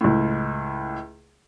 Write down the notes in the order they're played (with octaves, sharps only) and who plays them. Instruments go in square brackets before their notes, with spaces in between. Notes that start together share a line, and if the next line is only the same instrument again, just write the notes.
[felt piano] C#2 A2